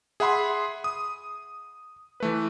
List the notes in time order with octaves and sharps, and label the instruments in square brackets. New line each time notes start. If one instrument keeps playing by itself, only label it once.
[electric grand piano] G#4 E5 F#5 B5 C6
D#6
E3 A3 B4